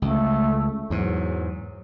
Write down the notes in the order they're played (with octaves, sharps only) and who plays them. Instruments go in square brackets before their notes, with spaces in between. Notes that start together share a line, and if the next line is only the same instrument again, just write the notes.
[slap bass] C#2 [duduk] A3
[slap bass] E2 G#2 [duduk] F#3